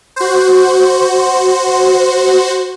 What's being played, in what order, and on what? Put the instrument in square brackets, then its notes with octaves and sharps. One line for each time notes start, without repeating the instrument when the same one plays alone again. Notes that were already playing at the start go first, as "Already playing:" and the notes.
[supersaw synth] F#4 C5